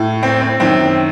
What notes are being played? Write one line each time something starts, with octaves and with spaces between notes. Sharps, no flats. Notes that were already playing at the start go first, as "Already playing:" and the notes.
Already playing: A2
C4
C4
F#2 D#3 C4